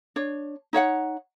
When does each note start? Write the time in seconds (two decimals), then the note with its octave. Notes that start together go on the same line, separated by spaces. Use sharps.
0.16 D4 C#5
0.73 D#4 C#5 F5 F#5